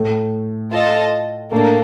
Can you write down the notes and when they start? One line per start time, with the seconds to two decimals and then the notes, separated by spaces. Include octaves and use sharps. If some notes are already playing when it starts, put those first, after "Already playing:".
Already playing: A2 A3
0.72 F4 A4 D#5 A5
1.52 A2 A3 A#3 D4 A4